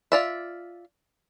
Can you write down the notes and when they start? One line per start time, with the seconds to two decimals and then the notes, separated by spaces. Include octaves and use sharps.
0.12 F4 D5 E5